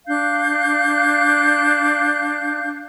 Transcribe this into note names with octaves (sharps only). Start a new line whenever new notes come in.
D4 F5 F#6 G6